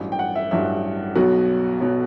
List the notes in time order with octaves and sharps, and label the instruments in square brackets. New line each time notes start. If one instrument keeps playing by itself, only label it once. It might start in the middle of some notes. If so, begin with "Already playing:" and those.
Already playing: [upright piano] A1 G2 F#3
G5
F#5
E5
A1 G2 F#3 E5
B1 B2 F#3 F#4
B2 F#3